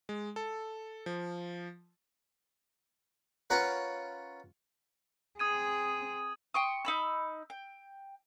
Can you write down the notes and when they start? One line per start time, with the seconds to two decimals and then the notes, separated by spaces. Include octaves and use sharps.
0.09 G#3
0.36 A4
1.06 F3
3.50 C#4 F4 A#4 B4 F#5
5.39 C4 G#4 D#6 G#6 D#7
6.54 G5 C6 C#6 D#6
6.85 D#4 B5 E6
7.50 G5